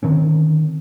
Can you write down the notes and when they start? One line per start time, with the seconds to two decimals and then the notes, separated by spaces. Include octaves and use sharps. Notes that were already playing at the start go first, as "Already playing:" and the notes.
0.03 D3 D#3 C4 C#4